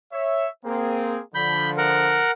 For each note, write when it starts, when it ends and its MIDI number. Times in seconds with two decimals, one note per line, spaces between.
0.12 0.46 73
0.12 0.46 76
0.65 1.21 58
0.65 1.21 60
0.65 1.21 68
1.35 2.26 50
1.35 2.26 53
1.35 1.70 83
1.35 1.70 91
1.78 2.31 70
1.78 2.31 78